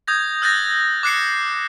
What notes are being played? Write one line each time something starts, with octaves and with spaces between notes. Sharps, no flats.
D#6 G6 G#6 A#6
E6 F#6 G6 A6 A#6
D6 F#6 C7 C#7